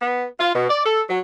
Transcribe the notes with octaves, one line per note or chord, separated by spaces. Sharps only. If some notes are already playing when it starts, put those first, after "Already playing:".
B3
F4
B2
D5
A4
F#3